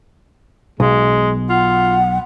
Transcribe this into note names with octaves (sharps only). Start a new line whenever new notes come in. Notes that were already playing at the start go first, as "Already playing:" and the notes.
B1 G#3
F4 F#5